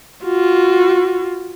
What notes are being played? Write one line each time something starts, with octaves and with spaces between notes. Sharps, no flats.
F4 F#4